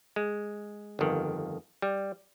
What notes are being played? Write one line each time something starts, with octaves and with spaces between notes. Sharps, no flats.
G#3
G1 F2 D#3
G3